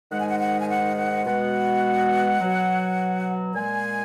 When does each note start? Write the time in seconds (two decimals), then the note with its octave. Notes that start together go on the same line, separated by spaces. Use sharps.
0.12 G#2 D#3 G#3 F#5
0.19 G#5
0.29 F#5
0.40 F#5
0.61 G#5
0.69 F#5
0.97 F#5
1.25 B2 G#3 F#5
2.41 B2 F#3
3.54 A#2 G#3 G#5